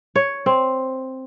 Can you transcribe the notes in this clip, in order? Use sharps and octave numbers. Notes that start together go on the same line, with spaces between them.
C#5
C4